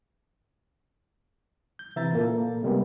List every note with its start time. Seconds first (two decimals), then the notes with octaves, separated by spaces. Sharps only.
1.79 G6
1.96 C3 E3 E4 E5 A#5 A6
2.13 A#2 A#3 A4
2.63 C3 G3 G#3 A#3 B3